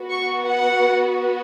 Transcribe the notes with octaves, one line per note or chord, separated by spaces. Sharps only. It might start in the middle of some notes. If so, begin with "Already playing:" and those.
Already playing: B3 F#4
C#6
F#5